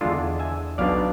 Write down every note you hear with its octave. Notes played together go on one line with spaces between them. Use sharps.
E2 D3 G#3 D4 F4 A4
E5 G#5
B1 B2 B3 D4 D5 F5